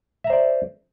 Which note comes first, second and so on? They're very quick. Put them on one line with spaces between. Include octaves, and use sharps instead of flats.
E5 A#5 C5 D5